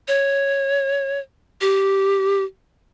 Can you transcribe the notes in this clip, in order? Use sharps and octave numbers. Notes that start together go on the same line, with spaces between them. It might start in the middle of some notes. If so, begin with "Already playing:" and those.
C#5
G4